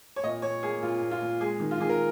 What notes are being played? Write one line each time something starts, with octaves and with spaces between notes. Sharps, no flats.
C#5
A#2 D#5
A#2 C#5
A#3 G#4
A#2 F4
A#2
F4
A#2
G#3 G#4
D#3
F4
D#3 G#4
A#4